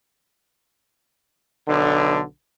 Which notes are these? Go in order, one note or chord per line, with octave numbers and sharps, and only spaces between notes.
B1 D3